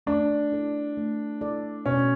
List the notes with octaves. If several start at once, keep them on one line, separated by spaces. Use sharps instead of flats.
A3 D4
E4 A4 D5
A3
E4 A4 D5
B2 C#4